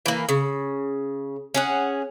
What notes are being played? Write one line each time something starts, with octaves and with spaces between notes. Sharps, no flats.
E3 A#3
C#3
C#4 G#4 F#5